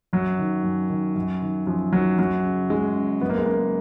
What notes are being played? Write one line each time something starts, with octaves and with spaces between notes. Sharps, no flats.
F#2 F#3
D#3
F#2
D#3
F#2
D#3
F#2 F3
D#3 F#3
F#2 F#3
C#3
F#2 G#3
C#3
F#2 B3
A#3
G#3
C#3 A#3